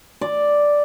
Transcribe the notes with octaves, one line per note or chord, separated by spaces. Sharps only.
D5